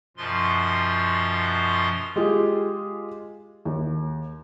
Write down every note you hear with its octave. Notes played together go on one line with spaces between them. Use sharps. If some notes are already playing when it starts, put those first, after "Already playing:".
F#2 B2 F3 F4 C6
G#3 F4 G4 G#4
D#2